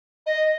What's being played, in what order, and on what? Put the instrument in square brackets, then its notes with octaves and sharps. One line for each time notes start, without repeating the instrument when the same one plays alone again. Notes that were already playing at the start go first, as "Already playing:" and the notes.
[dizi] D#5